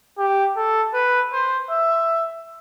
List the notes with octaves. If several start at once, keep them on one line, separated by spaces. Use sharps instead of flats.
G4
A4
B4
C5
E5